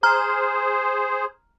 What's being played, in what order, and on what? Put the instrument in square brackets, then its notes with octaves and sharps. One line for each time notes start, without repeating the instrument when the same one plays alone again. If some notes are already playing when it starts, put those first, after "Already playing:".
[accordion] G#4 C5 [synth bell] A#5 F6